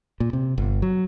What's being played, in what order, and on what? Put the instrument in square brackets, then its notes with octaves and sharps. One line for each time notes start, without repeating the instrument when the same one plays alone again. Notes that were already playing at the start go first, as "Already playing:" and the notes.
[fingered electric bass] A#2
C3
G1
F#3